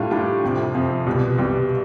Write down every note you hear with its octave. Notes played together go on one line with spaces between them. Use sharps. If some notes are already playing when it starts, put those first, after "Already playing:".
Already playing: A2 G3 D4 F4
A2 G3 D4 F4
F2 C3 F3
F2 C3 F3
C2 B2 G3
C2 B2 G3